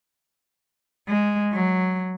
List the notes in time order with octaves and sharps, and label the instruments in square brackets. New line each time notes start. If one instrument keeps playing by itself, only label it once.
[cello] G#3
F#3